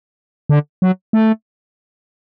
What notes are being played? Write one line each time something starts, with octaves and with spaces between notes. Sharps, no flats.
D3
F#3
A3